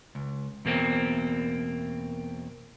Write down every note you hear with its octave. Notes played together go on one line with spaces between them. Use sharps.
C#2
E2 B2 A#3 C4